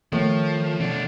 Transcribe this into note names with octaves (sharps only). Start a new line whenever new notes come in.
A2 D#3 F3
B2 D4